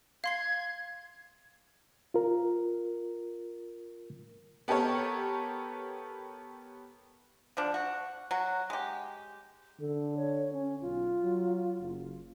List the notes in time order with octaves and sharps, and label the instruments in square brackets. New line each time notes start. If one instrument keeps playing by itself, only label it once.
[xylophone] F5 C6 C7 [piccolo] G#6
[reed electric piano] F4 A#4
[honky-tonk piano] B3 G4 A4 A#4 C#5
[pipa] D3 F3 D4
F#4
F#3 F#4
G#3 G4
[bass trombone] D3 [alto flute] A4
[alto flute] C#5
C#4
[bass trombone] B1 [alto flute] F4
[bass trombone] F#3
F#1